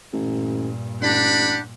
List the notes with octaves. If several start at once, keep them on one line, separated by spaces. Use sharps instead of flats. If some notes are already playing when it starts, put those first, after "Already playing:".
A1 G2 A#2
A1 D4 G4 F#5 B5